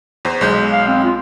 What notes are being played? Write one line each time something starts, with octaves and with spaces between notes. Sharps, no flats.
E2 C5
B1 G#3 G6
F5
C4
F4